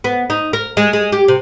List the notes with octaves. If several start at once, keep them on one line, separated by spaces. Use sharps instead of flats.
B3
D#4
A#4
G#3
G#3
G4
C3